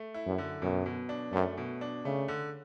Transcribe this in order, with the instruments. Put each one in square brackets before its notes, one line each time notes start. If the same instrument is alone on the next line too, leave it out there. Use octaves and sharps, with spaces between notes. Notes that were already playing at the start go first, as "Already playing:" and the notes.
Already playing: [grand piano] A3
E4
[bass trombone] F#2
[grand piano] D3
[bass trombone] F#2 [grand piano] B2
[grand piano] B2
D4
[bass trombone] F#2 [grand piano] A3
[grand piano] B2
D4
[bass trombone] C#3 [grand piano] A3
[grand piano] D3